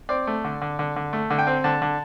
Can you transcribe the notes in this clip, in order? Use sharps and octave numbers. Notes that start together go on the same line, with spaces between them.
C4 D5
A3
D3
D3
D3
D3
A3
D3
G5
C4
D3 A5
D3